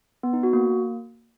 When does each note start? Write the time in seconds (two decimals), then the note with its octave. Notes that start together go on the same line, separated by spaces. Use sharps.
0.23 B3
0.33 D#4
0.43 F#4
0.53 A#3